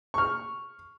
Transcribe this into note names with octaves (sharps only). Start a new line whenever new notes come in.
C#6 F6